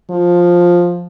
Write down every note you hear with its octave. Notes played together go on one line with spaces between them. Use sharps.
F3